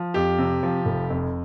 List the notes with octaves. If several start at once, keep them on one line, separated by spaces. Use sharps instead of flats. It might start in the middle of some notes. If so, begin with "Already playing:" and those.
Already playing: F3
F2 G4
C3
F3
F1
F2